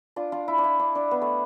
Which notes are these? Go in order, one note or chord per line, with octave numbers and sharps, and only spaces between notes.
D4 F4
D4 F4
E4
D4
E4
D4
D4
B3
A3